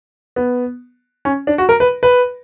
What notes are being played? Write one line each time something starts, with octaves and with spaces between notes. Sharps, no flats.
B3
C#4
D4
F#4
A#4
B4
B4